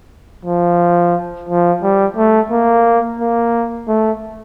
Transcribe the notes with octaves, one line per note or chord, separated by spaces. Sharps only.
F3
F3
G3
A3
A#3
A#3
A3